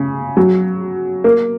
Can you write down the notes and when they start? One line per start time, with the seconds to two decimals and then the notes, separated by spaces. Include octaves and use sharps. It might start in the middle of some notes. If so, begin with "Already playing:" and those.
Already playing: C#3
0.37 F#3
1.24 A#3